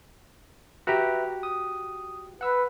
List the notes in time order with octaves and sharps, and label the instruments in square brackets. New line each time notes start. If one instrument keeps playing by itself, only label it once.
[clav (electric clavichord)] F#4 G4 [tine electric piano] B4 E5 A#5
[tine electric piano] D#6
[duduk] B4 [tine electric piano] F#5 E6